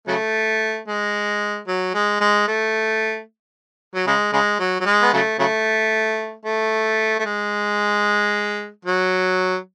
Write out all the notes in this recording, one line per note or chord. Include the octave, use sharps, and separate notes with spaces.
C#3 F#3 A3
G#3
F#3
G#3
G#3
A3
F#3
C#3 G#3
C#3 G#3
F#3
F#3
G#3
B3
C#3 F#3 A3
C#3 F#3 A3
A3
A3
G#3
F#3